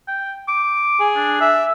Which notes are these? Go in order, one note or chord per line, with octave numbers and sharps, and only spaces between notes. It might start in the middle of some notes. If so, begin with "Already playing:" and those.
G5
D6
G#4
D4
E5